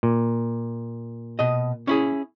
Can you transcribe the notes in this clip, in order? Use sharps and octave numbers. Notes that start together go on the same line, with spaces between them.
A#2
B2 D#5
C#4 E4 G#4